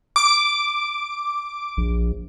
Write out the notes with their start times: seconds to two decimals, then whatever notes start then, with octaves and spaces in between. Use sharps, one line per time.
0.16 D6
1.77 A#1